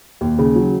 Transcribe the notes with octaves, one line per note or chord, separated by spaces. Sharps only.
D#2
C#3
F#3